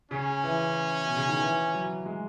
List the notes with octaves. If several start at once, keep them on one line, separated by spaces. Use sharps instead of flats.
C#3 C#4
E3
B2
C#3
D#3
E3
F#3
G#3